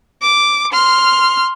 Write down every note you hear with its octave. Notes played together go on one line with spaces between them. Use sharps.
D6
C6 F6